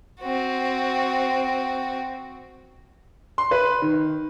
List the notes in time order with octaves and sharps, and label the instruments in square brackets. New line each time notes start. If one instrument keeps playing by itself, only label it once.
[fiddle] C4 F#4
[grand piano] C6
B4
D#3